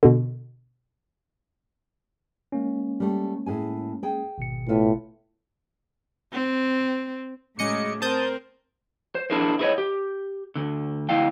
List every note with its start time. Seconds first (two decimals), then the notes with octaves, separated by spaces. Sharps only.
0.03 B2 D3
2.52 G#3 A#3 C#4
3.00 G3 A3
3.46 A2 G#4 G#5
4.03 G#4 G5
4.38 G#1 B2 C#7
4.68 A2 B3 F4 E5
6.32 C4
7.59 A2 C#3 F#3 G#3 D#5 D6 C#7
8.02 C4 A#4 C5 A5 D#6 G6
9.15 C5
9.30 D4 E4 G#4 A#4 C5
9.59 E4 G#4 A#4 B4 C#5 D#5
9.78 G4
10.56 D2 D3
11.09 D2 E4 F5 G5